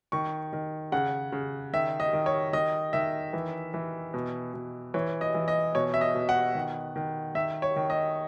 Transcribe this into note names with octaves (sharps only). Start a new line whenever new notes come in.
D#3 C#6
D#3
C#3 F#5
C#3
D#3 E5
D#5
D#3
C#5
D#3 D#5
D#3 E5
E3
E3
B2
B2
E3 C#5
D#5
E3
D#5
B2 C#5
E5
D#5
B2
F#5
D#3
D#3
D#3 E5
C#5
D#3
D#5